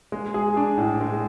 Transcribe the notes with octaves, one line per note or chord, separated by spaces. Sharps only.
G#3
G#4
D4
A2
G#3